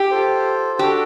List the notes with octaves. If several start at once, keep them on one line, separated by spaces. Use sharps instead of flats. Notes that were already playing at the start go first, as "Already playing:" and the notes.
Already playing: G4
F4 A4 C5
D4 F#4 G4 A4